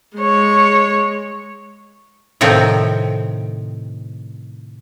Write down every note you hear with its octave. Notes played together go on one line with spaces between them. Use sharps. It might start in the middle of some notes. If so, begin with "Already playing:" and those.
G#3 C#5
A2 C3 D#3 F3 C4